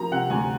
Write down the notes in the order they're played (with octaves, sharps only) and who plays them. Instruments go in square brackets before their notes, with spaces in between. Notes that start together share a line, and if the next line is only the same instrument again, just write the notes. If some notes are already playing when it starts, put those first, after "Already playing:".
Already playing: [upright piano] F3 A#3 A#5
C3 F#5
D2 G#5